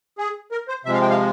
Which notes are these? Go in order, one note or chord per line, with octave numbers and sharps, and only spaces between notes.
G#4
A#4
C5
C3 F3 G#3 E5
F5
G5
F5